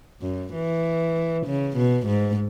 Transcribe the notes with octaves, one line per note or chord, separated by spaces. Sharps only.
F#2
E3
C#3
B2
G#2